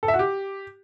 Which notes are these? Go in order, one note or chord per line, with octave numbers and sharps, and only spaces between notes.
A4
E5
F#4
G4